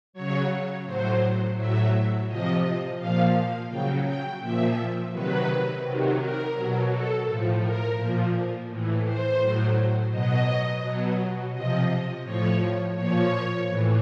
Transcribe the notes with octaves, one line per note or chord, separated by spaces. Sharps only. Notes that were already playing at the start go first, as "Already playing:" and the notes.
C#3 F#3 C#5
A2 F#3 C5
A2 F#3 E5
C3 F3 D#5
A#2 F3 F5
C#3 F#3 G5
G5
A#2 F3 E5
C3 D#3 F#3 B4
C3 D#3 F#3
A#4
B2 F#3
A4
A2 F3
A#4
A#2 F3
A2 E3
C5
A2 F#3
B2 F#3 D#5
B2 F#3
C3 F3 D#5
A2 F3 C#5
A#2 F3 C#5
A2 E3